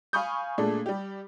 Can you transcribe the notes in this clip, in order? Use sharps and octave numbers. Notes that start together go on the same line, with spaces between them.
F5 G#5 B5 C#6 D#6 G6
A#2 G#3 A3 D4
G3 G4